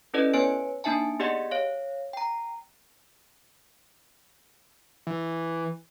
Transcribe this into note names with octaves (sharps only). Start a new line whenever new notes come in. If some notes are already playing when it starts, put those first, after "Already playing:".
C#4 E4 A4 B4 D5 D#5
B3 B4 C#5 G#5 D7
A#3 D4 D#4 E5 G#5 A5
B3 G4 G#4 D5 D#5 F#5
C#5 F5
G5 A#5
E3